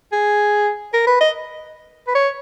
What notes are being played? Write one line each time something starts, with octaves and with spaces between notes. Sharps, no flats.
G#4
A#4
B4
D#5
B4
C#5